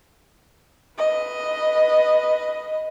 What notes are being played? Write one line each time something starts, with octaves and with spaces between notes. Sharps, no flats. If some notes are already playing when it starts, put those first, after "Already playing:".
B4 D#5